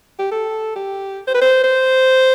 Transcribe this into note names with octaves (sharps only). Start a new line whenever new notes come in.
G4
A4
G4
C5
B4
C5
C5